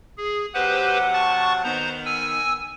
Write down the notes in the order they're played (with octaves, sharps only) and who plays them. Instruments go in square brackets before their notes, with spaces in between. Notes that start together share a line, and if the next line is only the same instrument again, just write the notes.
[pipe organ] G#4
[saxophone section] C3 F#3 F#5 [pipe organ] G4 B4 C5
[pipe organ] A5 C#6 A6
[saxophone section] D#3 B3 [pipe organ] C5 A#5
[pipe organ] G#5 E6